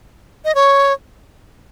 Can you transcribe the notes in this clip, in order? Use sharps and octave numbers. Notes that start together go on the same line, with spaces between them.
D#5
C#5